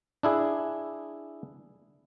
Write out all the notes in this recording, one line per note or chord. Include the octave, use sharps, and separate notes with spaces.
D4 E4 G#4